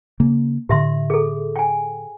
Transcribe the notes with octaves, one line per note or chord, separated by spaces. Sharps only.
C#3 A#3
A2 D3 G4 E5 C6
G#4 A4
G5 G#5